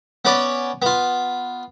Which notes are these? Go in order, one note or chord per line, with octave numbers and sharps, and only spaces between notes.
B3 C#4 B4 C#5 D5
B3 F4